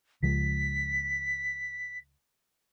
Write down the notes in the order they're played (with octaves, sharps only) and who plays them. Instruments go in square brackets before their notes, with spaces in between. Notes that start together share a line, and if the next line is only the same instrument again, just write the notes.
[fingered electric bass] C#2 F3 G#3 [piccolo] B6